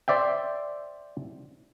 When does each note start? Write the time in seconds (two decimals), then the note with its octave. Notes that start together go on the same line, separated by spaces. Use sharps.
0.08 C5 D5 E5 G5